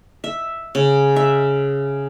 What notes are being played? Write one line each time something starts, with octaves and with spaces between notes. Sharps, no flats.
E5
C#3
E5